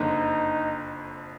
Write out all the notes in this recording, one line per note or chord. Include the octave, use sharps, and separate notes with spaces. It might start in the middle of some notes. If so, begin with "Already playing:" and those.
Already playing: F#1 F2 D3 D#4